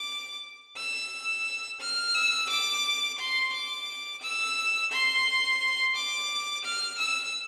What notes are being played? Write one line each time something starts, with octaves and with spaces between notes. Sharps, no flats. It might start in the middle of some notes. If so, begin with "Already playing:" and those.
Already playing: D6
E6
F6
E6
D6
C6
D6
E6
C6
D6
F6
E6